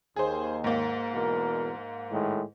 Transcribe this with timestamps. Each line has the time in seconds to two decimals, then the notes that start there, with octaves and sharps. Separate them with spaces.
0.16 D#2 G#4 C5
0.64 G#2 A#3
1.13 E2 B2 A#4
2.11 A2 D#3 G#3